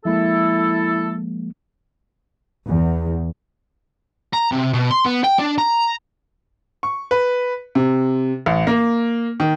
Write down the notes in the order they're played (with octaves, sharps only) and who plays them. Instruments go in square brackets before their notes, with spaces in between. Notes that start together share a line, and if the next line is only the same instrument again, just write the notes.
[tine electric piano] F3 G#3 A#3 [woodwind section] E4 A4
[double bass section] E2
[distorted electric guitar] A#5
C3
B2
C6
B3
G5
D4
A#5
[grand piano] C#6
B4
C3
A1
A#3
D#3